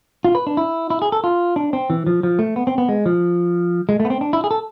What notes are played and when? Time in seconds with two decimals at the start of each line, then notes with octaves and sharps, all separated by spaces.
0.25 F4
0.35 B4
0.47 D4
0.57 E4
0.90 E4
1.02 G#4
1.12 A4
1.24 F4
1.56 D4
1.73 C4
1.90 E3
2.07 F3
2.23 F3
2.39 A3
2.56 B3
2.67 C4
2.78 B3
2.89 G#3
3.06 F3
3.89 G#3
4.00 A3
4.05 B3
4.10 C4
4.21 D4
4.33 E4
4.44 G#4
4.51 A4